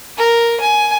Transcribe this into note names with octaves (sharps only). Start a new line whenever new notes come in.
A#4
G#5